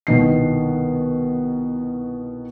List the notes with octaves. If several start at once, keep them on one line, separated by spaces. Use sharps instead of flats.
C2 B2 D#3 C7